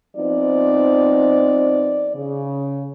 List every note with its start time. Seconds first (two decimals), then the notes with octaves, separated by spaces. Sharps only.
0.17 F3 B3 C4 D#4 D5
2.16 C#3